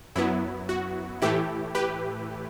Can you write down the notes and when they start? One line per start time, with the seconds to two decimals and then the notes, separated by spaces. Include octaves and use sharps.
0.15 F#2 F#3 B3 E4
0.69 F#4
1.22 A2 E3 A3 E4 G4
1.75 G4 B4